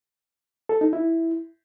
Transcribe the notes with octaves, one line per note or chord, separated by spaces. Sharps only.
A4
D#4
E4